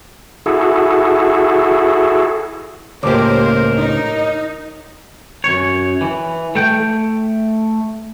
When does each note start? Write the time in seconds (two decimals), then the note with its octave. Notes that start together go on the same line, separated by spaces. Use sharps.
0.46 E4 F#4 G#4 A4
3.03 C#2 A2 A#3 G4 A#4 C5 C#5 D6
3.78 D#4
5.44 F#2 C#5
6.01 E3
6.55 A3 G5